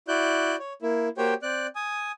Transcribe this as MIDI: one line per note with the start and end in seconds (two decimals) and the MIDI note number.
0.08 0.56 64
0.08 0.56 66
0.08 0.56 74
0.08 0.56 90
0.08 0.56 91
0.59 0.73 73
0.82 1.09 58
0.82 1.09 64
1.18 1.34 58
1.18 1.34 66
1.18 1.34 67
1.18 1.34 72
1.18 1.34 73
1.18 1.34 79
1.43 1.67 60
1.43 1.67 74
1.43 1.67 90
1.76 2.12 80
1.76 2.12 87